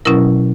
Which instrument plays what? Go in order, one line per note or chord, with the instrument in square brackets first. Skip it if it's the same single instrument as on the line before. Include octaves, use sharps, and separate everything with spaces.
[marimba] B2 F#3 C#4 E4 A#4